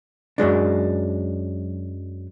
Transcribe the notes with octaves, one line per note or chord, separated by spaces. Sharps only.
F#2 F#3 G#3 D4